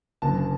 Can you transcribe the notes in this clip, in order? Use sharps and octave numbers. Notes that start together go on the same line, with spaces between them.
F#1 F#2 D3 F#3 A#3 A5